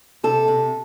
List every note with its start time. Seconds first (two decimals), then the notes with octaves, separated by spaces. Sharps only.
0.23 C3 A4
0.48 C3